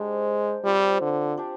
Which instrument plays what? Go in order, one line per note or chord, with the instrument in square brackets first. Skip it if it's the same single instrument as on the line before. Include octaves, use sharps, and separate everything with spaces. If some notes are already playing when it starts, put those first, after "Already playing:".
Already playing: [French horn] G#3 [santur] D4 G4 C5
[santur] F3 G#3 C4 [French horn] G3
[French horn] D3
[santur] D4 G4 D5